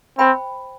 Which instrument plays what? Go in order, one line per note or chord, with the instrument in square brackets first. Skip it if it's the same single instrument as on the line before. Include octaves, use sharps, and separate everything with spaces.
[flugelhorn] C4 [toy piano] C5 G5 B5